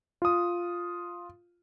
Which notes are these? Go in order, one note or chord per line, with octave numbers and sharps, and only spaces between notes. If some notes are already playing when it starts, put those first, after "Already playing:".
F4 D#6